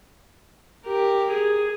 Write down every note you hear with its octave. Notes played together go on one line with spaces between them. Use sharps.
G4 A#4
G#4